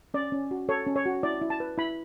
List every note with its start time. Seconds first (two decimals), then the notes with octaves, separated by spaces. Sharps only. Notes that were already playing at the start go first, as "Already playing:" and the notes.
0.14 C#4 D5
0.32 C#4
0.51 F#4
0.69 A4 C#5
0.87 C#4
0.96 C#5
1.06 F#4
1.23 E4 D5
1.42 E4
1.50 A5
1.60 B4
1.78 E4 B5